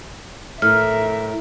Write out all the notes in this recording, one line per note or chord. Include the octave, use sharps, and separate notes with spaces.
A2 A#4 E5 F6